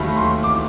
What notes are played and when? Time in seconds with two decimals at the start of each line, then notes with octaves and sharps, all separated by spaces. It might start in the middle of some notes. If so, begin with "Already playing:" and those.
Already playing: D#2 D#3 F#3 A3 B5
0.16 C6
0.44 D6